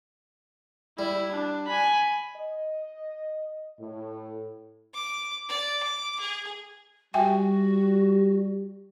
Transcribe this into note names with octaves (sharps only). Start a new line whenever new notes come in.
G3 E4
D4
G#5 B5
D#5
A2
D6
D5
D6
G#4
G3 F#4 E5 G5 G#5